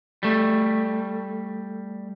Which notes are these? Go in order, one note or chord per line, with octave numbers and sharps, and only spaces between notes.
G3 A3